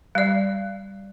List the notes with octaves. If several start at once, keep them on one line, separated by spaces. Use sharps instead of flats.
G3 D5